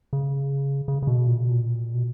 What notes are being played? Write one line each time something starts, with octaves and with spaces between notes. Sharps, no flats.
C#3
C#3
C#3
B2
A#2
B2
A#2
B2